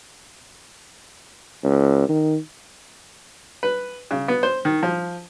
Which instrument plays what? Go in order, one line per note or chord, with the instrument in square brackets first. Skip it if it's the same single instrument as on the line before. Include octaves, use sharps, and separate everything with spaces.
[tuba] C#2
D#3
[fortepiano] B4
C#3
B3
C5
D#3
F3